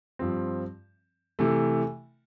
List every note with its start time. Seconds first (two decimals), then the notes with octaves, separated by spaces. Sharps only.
0.19 G2 F3 C4
1.39 C3 E3 A3